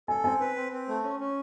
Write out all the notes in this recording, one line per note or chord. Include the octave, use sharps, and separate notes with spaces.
A4 G#5
C4 G#5
B4
C4
C4
A3
C#4
C#4